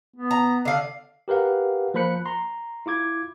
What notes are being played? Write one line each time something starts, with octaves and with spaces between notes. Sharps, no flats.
B3
A#5
D3 F5
G4 A#4 B4 F5 F#5
F3 A#3 C5 B5 F#6 C#7
A#5 C6
E4 F4 D6 G#6